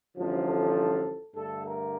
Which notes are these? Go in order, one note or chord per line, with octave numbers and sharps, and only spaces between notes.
A1 G2 D3 F3
A4
G2 D3 A3 A4
A#4